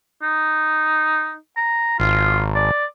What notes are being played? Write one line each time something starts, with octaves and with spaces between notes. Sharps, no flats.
D#4
A#5
G#1 F4
D5